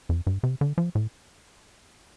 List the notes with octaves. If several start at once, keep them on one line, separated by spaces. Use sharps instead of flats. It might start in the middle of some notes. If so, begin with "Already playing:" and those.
F2
G2
C3
D3
F3
A2